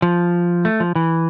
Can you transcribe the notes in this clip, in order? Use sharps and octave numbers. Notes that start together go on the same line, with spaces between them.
F3
A3
F3
E3